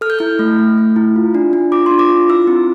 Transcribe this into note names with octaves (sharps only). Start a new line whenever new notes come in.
A4 F6
G6
E4 F6
A3
A3
A3
E4
F4
D4
D4
F4 D6
D4 C6
D6
F4
E4 E6
C4